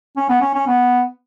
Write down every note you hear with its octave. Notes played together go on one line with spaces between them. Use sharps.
C#4
B3
C#4
C#4
B3